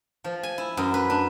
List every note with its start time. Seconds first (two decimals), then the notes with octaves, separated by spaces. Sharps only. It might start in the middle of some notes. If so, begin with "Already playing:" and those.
0.24 F3
0.43 G#5
0.58 E4
0.77 F#2
0.94 B4
1.10 D4